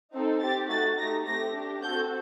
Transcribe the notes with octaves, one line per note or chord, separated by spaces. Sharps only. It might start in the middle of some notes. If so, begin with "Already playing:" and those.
C4 D#4 A4
C4 G4 A6
A3 D#4 F#4 A6
A3 D#4 G4 A#6
A3 C4 G4 A#6
D4 G4
C4 F#4 A4 G6